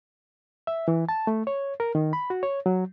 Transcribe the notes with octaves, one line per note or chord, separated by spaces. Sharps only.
E5
E3
A5
A3
C#5
A#4
D#3
B5
F#4
C#5
F#3